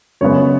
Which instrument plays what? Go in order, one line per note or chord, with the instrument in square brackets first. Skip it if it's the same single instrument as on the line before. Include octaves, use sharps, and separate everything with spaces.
[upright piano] F#2 C#3 G#3 B3 C#5